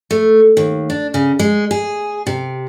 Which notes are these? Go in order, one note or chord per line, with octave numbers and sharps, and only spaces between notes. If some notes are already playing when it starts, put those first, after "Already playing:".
A3
D#2
D4
C#3
G#3
G#4
C3